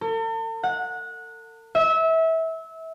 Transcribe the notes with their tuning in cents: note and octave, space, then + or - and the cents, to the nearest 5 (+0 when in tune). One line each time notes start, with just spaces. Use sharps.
A4 +45
F#5 -20
E5 -25